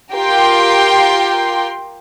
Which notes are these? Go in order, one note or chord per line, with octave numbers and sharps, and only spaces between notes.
F4 G4 A#4 G5 C6